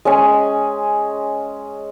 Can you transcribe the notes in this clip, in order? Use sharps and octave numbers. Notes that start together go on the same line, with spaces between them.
G#3 C#4 G#5